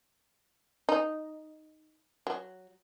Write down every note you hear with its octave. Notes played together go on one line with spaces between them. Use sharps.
D#4
F#3